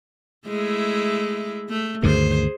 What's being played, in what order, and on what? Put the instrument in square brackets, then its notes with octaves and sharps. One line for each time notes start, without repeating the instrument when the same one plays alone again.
[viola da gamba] G#3 A3 E4
A3
[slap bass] D2 G2 D#3 [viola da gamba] G#4 C5